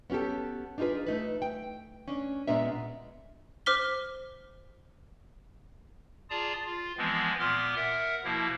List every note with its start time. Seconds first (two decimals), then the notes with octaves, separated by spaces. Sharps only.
0.10 B3 C#4 F#4 G4 A4
0.78 D4 D#4 F4 G#4 B4
1.07 A3 D#4 B4
1.42 G5
2.08 C#4 D4
2.47 A#2 G#3 B3 D4 A#4 E5
3.66 C5 D6 F6 B6 G7
6.30 F4 G#4 D5 A5 A#5 D#6
6.66 F4
6.98 E3 F3 G#3 B3 C4
7.40 A#2 B3 C6 D6 F6
7.76 A#4 E5 F#5
8.24 B2 F3 A#3 E4